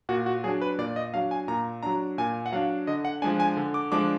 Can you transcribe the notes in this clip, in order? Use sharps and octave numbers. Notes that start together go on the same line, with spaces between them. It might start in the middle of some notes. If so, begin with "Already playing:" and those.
A#2 F#4
F#4
F#3 D4 G#4
B4
A#2 D5
D#5
F#3 D4 F5
G#5
A#2 A#5
F#3 D4 A#5
A#2 G#5
F#5
F#3 D4 F5
D3 D#5
F#5
F3 G#3 D4 G#5
G#5
D3
D6
F3 G#3 D4 D6